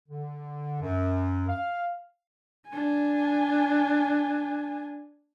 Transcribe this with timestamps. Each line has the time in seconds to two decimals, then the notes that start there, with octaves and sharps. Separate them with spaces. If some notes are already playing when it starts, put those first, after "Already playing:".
0.09 D3
0.81 F#2
1.48 F5
2.69 D4 G#5